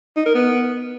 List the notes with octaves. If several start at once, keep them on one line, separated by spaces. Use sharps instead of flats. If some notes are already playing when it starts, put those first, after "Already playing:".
D#4
A#4
B3